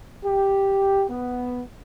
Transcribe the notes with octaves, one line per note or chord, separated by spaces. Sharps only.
G4
B3